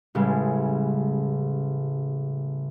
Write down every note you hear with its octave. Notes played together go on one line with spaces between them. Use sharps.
A1 C#3 G3 G#3